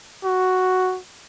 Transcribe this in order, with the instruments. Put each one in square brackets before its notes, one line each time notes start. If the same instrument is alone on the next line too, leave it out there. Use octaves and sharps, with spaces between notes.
[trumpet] F#4